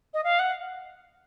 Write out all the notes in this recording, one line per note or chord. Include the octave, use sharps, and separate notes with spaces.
D#5
F5
F#5